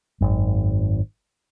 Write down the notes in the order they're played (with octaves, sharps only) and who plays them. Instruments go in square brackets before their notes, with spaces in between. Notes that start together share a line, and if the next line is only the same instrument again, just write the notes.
[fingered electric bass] G#1 F#2